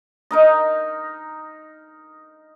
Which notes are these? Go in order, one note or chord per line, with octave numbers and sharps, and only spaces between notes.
D#4 A#4 D#5